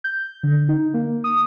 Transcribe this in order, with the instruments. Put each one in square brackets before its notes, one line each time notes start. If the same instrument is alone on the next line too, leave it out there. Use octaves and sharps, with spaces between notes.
[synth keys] G6
D3
D#4
A#3
D#6